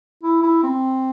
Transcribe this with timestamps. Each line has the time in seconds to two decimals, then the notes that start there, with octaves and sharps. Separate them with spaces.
0.23 E4
0.43 E4
0.63 C4